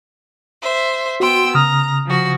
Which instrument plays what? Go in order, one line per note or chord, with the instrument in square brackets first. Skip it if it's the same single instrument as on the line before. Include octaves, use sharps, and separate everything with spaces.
[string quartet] C5 E5
[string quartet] B3 G5 E6 [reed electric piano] F#4 C6
[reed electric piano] C#3 D#6 F6 [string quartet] A#5
[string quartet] F3 F#4